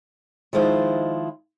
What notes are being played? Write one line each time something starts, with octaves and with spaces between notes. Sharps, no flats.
D#3 F3 G#3 E4 F4 C5